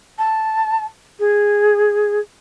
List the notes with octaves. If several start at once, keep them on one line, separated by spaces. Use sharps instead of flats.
A5
G#4